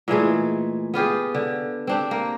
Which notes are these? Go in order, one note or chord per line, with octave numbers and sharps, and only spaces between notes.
A#2 E3 G#3 A3
B3 F4 G4 G#4
D3
C4 D4 G4
A#3